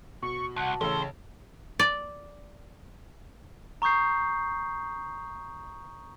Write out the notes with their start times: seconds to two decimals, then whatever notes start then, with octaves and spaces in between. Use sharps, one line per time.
0.22 B2 C#6
0.56 C2 F#5 A5
0.81 A1 C#3 A4 C5
1.80 D5
3.82 A#5 C#6 D#6 G6 C7